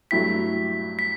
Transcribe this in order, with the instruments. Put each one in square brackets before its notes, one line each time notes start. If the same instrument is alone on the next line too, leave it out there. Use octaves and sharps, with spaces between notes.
[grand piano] G2 F#3 A3 E4 G4 [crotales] B6
[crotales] B6